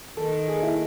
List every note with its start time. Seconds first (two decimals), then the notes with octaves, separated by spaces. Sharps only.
0.17 D#3 A4
0.48 G#4
0.63 E4